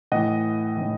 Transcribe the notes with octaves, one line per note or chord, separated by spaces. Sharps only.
A2 E3 D#5 F#5
A2 E3